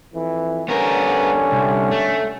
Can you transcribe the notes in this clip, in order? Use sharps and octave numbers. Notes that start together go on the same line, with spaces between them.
F2 E3
D3 G3 B3 C#4 A#4
C2
A3